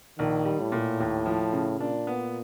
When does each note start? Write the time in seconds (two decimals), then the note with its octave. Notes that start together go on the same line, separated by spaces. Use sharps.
0.19 A#1 D#3
0.45 G3
0.59 A2
0.72 A#2
1.00 D#2
1.26 F3
1.52 C#3
1.79 A#2 D4
2.07 B3